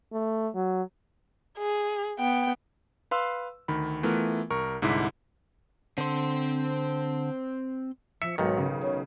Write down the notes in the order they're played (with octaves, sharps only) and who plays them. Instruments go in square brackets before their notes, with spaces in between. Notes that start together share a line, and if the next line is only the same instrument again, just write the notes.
[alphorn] A3
F#3
[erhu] G#4
[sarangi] B3 [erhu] G5
[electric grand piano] B4 F5 C6 E6
D2 D#3 B5
E3 A3 B3 F4 A#4
C2 A#4 C#6
C2 G#2 D3 E4 D6 B6
[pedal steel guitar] D3 [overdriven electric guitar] C4 C5
[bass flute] F3 [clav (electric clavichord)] E5 [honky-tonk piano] C#7
[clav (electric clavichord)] B1 D#3 [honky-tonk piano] G#2 [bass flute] F#3
[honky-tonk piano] C#3
[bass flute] C#5